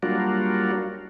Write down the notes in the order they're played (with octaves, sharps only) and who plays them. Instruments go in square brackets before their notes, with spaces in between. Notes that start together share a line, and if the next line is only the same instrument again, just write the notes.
[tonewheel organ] F#3 G3 A#3 D4 F4 F#4